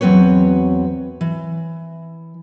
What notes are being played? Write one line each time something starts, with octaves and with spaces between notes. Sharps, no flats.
E2 F#3 C4 B4 C#5
E3